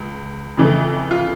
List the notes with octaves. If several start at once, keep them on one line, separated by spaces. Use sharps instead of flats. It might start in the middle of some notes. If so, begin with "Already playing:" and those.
Already playing: C#2
F2 C#3 E3 A3
F4